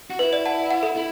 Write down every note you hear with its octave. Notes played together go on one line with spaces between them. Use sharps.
F#4
E4 B4
D5
F#5 A5
F#5
A4
E4